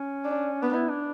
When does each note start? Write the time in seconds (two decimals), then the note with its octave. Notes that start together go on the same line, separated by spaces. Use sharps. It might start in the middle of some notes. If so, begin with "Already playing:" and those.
Already playing: C#4
0.25 D4
0.63 B3 D4
0.75 E4
0.89 D4